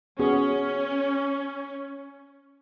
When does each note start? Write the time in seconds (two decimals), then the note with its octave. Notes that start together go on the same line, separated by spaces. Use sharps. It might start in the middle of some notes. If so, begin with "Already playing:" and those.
0.19 B3 C#4 F#4 G#4